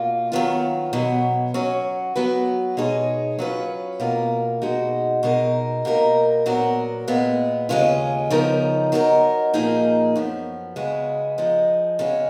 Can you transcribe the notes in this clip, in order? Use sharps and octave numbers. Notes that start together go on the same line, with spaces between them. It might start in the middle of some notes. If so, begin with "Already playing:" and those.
Already playing: B2 A#3 F4
D#3 F#3 B3 F4
B2 F#3 B3
F#3 C#4 F#4
F#3 B3 F#4 B4
B2 G#3 D#4 G#4 C#5
F#3 C#4 F4 B4
B2 A#3 F4 A#4
B2 G#3 D#4 F#4
B2 G#3 D#4 A#4
B2 A#3 D#4 A#4
A#2 F#3 B3 F#4 A#4
A#2 G#3 B3
D#2 C#3 G#3 C#4 F4
C#3 F3 B3 D#4 A#4
F#3 B3 D#4 F#4 A#4
A#2 F3 A#3 D#4 G#4
F#2 F3 B3
C#3 G#3 B3 F#4
F3 G#3 D#4
C#3 G#3 C#4 F#4